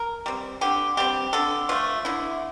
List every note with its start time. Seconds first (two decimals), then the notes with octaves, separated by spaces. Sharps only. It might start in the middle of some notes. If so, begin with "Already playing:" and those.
Already playing: A#4
0.26 G3 C4
0.61 D3 G4
0.97 G3 C4 G4
1.33 D3 A4
1.69 F3 A3 F4
2.05 D3 E4